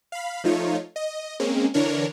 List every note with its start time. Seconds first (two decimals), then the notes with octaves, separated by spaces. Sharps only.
0.12 F5 B5
0.44 F3 A3 D#4 F4 C#5
0.96 D#5
1.40 G#3 A#3 C4 C#4
1.74 D3 E3 D4 A#4 C#5